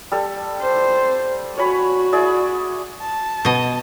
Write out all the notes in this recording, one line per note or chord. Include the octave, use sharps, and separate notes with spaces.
G3 A4
C5
F#4 C#5 G#5 B5
E4 G#4 D5
A5
B2 D#5